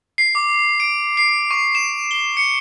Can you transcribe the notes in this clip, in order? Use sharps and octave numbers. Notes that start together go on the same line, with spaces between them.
C7
D6
D7
C7
C#6
E7
G7
C#7